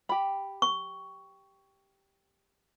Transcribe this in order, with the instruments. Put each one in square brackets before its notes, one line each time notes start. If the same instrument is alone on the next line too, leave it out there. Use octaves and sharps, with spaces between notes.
[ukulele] G4 B5
[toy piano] C#6